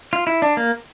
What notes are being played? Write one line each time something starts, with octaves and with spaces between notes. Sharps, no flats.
F4
E4
D4
A#3